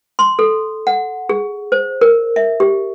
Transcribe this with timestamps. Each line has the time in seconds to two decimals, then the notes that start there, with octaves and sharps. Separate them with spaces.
0.19 C6
0.39 A4
0.87 F#5
1.29 G#4
1.72 C5
2.01 A#4
2.36 E5
2.60 G4